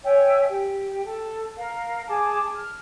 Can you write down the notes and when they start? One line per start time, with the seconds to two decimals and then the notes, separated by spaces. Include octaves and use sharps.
0.04 C#5 E5 G5 G#5
0.47 G4
1.05 A4
1.56 A#4 F5
2.07 G#4 G#5 A5 D6
2.55 F6